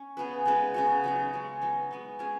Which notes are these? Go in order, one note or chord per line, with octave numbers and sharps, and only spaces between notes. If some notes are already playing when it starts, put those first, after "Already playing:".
Already playing: C#4
C#3 B3 G#4 B4
C#3 G#3 D#4 B4
C#3 B3 F#4
C#3 F#3 D#4
C#3 G#3 C#4
F#3 B3 D#4
G#3 B3 D#4
G#3 C#4 G#4